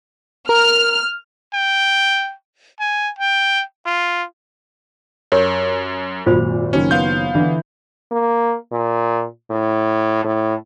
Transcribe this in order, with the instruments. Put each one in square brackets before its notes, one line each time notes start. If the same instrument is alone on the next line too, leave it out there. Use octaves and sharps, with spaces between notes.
[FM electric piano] A#4 [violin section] F6
[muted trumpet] G5
G#5
G5
F4
[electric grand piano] F#2 [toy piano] G4 A#4 C#5
[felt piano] G#1 F#2 A#2 [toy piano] F4 C5 B5
[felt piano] F#1 D#3 C#5 [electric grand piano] C#4
[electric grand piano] B3 F5 G6 [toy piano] C6
[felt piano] D3 E3 E4
[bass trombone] A#3
A#2
A2
A2